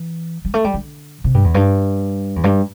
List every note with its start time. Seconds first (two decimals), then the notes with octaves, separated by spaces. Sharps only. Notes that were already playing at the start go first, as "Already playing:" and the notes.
Already playing: E3
0.45 G3
0.54 A3
0.64 G3
0.74 D3
1.24 C3
1.34 G2
1.44 E2
1.54 G2
2.36 E2
2.44 G2